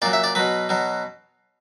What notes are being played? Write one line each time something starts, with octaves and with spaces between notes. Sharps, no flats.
A#2 F#3 D5
E5
D5
B2 F#3 B4
B2 F#3